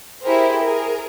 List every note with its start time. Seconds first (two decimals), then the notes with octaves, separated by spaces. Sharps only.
0.23 E4 G4 G#4 A#4 C5
0.61 G#4 A#4